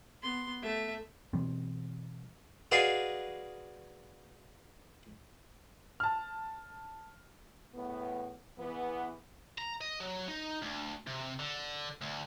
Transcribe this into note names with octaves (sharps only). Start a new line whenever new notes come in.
B3 C6
A3 E5
B2 E3 G3 C4
F#4 G#4 B4 D5 D#5 F5
A5 F6
E2 A2 B3
E2 E3 B3
A#5
D#5
F#3
D#4
D2
C3
D3
D2